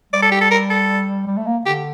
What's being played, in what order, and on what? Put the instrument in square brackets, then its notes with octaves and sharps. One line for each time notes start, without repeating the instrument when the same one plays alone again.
[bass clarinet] G3 [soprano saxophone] D5
[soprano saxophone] A4
G4
A4
A#4
A4
[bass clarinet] G3
A3
A#3
[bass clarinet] D3 [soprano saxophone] G4